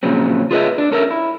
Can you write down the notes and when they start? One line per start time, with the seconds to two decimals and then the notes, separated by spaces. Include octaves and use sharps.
0.03 A#2 C#3 F3 F#3 C4
0.51 F4 G#4 B4 C#5 D#5 E5
0.78 D4 D5
0.91 C#4 A4 A#4 D5 E5
1.11 E4